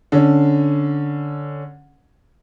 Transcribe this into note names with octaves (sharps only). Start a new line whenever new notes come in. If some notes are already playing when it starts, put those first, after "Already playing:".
D3 C#4